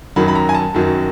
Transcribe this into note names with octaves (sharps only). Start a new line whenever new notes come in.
F#2 D#3 F#3 B5
B5
A#5
G#5
A5
F#2 D#3 F#3